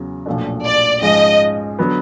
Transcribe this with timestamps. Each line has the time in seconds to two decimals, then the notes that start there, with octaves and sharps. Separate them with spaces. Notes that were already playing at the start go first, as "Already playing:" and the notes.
Already playing: E2 C#3 F#3
0.26 B1 A#2 F3 A3 D4
0.65 D5
1.02 G#2 F3 G#3 C#4 D#5
1.79 D3 F#3 B3